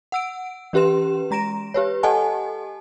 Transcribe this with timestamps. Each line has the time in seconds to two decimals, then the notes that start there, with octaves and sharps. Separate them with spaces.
0.12 F#5 E6 D7
0.73 E3 C#4 G4 B4 C6 E7
1.31 G#3 A#5 A#6 D7 E7
1.74 G4 B4 C#5
2.03 G4 A4 D#5 F#5 G#5 A5